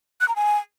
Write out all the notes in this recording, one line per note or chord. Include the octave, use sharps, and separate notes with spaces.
F#6
A#5
G#5